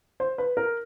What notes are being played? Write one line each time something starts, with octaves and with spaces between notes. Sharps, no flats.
C5
B4
A#4